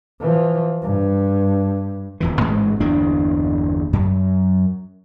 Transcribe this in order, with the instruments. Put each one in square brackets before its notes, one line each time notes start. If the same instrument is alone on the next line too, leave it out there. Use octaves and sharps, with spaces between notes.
[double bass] E3 F3
G2
[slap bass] D1 F2 E3
A1 G#2 E3 G#3
G1 E2 A#3 D4
F#2